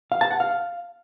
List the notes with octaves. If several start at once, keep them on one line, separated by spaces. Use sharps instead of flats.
F5
A5
F#5
F5